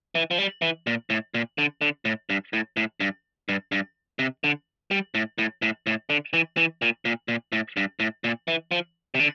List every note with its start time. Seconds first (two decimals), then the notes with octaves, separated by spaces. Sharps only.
0.15 E3
0.31 F3
0.38 G3
0.62 E3
0.87 A#2
1.10 A2
1.34 A#2
1.58 D3
1.81 D3
2.05 A2
2.30 G2
2.53 A2
2.77 A2
3.00 G2
3.49 G2
3.72 G2
4.19 C3
4.44 D3
4.91 G3
5.14 A2
5.38 A2
5.62 A2
5.87 A2
6.10 D3
6.33 E3
6.57 E3
6.82 A#2
7.05 A#2
7.28 A#2
7.52 A2
7.77 G2
8.00 A2
8.24 A#2
8.48 E3
8.71 F3
9.15 C3
9.20 D3